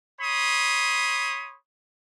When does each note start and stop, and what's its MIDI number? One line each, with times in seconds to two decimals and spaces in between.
0.21 1.56 73
0.21 1.56 83
0.21 1.56 84
0.21 1.56 87